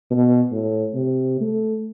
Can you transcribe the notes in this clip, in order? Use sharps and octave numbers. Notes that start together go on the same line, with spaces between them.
B2
A2
C3
A3